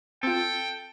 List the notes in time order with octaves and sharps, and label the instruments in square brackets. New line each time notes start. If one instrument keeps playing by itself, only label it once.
[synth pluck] C4 F4 [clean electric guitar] A4 [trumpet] G5